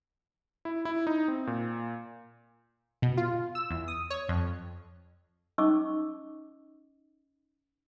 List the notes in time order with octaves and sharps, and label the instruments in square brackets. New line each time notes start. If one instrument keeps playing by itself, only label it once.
[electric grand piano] E4
E4
D#4
C4
A#2
[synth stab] B2
F4
E6
E2
D#6
C#5
F2
[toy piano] C#4 D#4 D#5 C#6 D6 E6